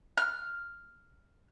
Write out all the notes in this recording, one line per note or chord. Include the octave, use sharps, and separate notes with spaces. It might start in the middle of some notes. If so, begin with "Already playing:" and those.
F6